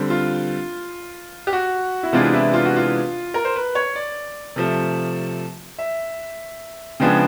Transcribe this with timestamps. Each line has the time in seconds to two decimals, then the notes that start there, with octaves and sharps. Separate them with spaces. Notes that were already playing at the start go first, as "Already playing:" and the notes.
Already playing: D3 G3 C4
0.10 F4
1.47 G4
1.53 F#4
2.03 E4
2.13 C3 E3 G#3 B3 D4 F4
2.34 E4
2.54 F4
2.65 F#4
2.76 F4
3.34 A#4
3.45 C5
3.56 B4
3.75 C#5
3.95 D5
4.56 C3 F3 A3
5.79 E5
7.00 C#3 F3 G#3 B3 D4 G5